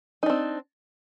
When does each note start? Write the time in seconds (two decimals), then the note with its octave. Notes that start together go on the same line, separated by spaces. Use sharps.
0.23 D#4
0.26 D4
0.30 C4